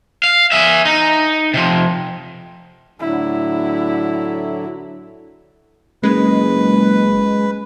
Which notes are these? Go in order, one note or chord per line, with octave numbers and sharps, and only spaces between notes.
F5
G#4 E5
D#4
C3 F3
A2 D3 F#3 E4
F#1 G#3 B4